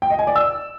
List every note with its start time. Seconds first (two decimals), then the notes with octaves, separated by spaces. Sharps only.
0.02 G5
0.10 D#5
0.19 G#5
0.27 D5
0.36 E6